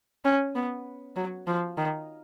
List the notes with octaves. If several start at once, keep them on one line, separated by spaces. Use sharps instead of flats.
C#4
B3
F#3
F3
D#3